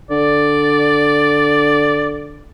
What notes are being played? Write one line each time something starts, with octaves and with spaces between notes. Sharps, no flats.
D3 D5